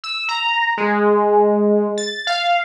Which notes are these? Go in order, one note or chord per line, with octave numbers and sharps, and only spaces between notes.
E6
A#5
G#3
A6
F5